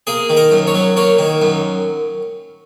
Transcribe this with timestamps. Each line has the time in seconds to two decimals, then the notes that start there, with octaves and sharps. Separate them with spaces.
0.07 A#3 G#4
0.30 D#3
0.37 A#4
0.51 F#2
0.67 C#5
0.75 F#3
0.97 A#3 C#5
1.18 D#3
1.42 F#2